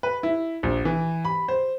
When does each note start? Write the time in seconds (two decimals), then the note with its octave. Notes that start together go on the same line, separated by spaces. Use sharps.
0.03 B4
0.23 E4
0.63 A#1
0.85 E3
1.25 B5
1.48 C5